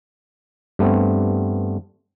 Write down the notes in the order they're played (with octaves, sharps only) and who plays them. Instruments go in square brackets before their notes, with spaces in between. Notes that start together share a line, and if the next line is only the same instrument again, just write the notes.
[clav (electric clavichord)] G2 A3 B3 C4